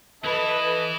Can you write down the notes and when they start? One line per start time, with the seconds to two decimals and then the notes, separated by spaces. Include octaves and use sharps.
0.24 E3 E4 A4 B4 D#5